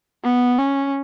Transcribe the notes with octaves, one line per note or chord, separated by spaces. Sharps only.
B3
C#4